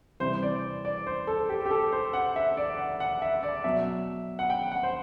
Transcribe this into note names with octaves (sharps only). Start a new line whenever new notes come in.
C3 E3 G3 C5
D5
D5
C5
A4
G4
G4
A4
C5
F#5
E5
D5
F#5
F#5
E5
D5
B2 F#3 E5
F#5
G5
F#5
C5